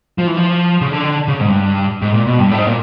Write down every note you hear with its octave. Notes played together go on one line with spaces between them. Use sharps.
F3
E3
F3
C#3
D3
C#3
G#2
G2
G#2
A#2
B2
G2
A2
G#2
A#2